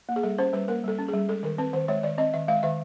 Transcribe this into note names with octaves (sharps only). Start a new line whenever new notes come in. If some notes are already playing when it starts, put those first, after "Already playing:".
A#3
G#4
G3 A4
C#4 C5
G3 B4
A#3 A#4
G3 A4
C#4
G#4
G3
G#3 A4
D#3 A#4
C4 B4
D#3 C5
G#3 C#5
D#3 D5
C4 D#5
D#3 E5
G#3 F5
D#3 E5